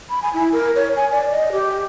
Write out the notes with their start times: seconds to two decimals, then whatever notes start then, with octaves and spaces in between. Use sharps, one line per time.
0.10 B5
0.22 G#5
0.34 E4
0.52 A#4
0.76 C#5
0.96 G#5
1.12 D5
1.31 D#5
1.52 G4